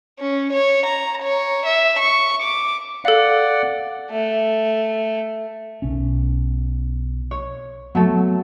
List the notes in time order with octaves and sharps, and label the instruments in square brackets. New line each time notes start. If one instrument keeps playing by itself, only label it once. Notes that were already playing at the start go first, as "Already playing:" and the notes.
[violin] C#4
C#5
A#5
C#5
E5
C#6
D6
[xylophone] A4 F5 [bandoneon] D5 F#5
[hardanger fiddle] A3
[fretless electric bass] B1 C#4
[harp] C#5
[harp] F#3 A3 A4 [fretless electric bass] B3